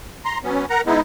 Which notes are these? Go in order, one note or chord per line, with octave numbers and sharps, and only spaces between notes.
A#5 C6
F#3 B3 C#4
A#4 F#5 A#5
G#3 B3 D#4 E4